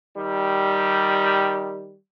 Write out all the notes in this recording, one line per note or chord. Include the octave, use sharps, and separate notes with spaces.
D#3 G3